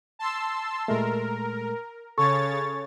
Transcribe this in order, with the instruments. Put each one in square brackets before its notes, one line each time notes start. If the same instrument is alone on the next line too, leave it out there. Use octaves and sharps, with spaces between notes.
[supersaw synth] A5 C6 E6
[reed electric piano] A#2 G#3 A3 [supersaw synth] A#4
[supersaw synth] C#3 C#5 A6 [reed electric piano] A4 [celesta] C#6